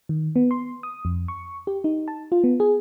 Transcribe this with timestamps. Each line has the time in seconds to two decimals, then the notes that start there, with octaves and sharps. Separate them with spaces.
0.09 D#3
0.36 B3
0.51 C6
0.83 D#6
1.05 F2
1.28 C#6
1.67 G4
1.84 D#4
2.08 A5
2.32 F4
2.44 B3
2.60 G#4